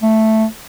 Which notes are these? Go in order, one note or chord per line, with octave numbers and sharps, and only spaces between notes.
A3